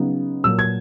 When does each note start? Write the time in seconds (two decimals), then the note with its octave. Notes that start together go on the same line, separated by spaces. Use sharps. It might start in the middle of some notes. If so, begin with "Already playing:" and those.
Already playing: C#3 F#3 B3 D#4
0.44 A#2 F#3 A#3 E6
0.59 G#6